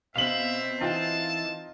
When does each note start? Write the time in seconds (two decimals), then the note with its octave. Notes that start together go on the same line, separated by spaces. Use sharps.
0.16 B2 C4 E5 F5 F#7
0.81 E3 D#4 F4 G5 A5